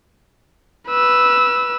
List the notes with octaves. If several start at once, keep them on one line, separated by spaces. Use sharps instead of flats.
B4 E6